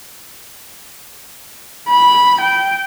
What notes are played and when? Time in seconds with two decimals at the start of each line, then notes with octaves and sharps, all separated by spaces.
1.89 B5
2.40 G5